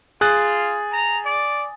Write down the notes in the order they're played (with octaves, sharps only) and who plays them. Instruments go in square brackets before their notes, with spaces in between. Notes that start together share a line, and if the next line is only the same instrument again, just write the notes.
[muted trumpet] F4 [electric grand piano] G#4 F#6 [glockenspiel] G#5 D#6 A6
[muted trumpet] A#5
D5